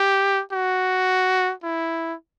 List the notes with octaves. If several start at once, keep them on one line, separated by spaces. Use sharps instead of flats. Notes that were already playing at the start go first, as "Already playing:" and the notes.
Already playing: G4
F#4
E4